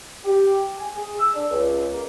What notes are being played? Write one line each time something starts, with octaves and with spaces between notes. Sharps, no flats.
G4
G#5
G#4
E6
D4
C#2
A#3